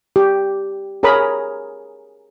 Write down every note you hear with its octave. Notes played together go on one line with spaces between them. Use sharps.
G4
G#4 A#4 C#5 A#5 B5 D#6